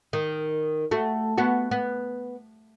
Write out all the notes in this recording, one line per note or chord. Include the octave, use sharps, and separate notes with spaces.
D#3
A3 F#4
B3 F#4
B3